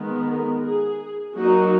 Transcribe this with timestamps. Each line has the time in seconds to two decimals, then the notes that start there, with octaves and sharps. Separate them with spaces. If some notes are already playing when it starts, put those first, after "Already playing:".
Already playing: D#3 G#3 B3
0.26 A#4
0.62 G#4
1.34 F#3 A#3 D#4 F#4